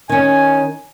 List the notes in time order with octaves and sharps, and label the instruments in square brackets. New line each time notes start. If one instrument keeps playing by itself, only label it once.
[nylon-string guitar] D#3 C#4 [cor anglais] G#5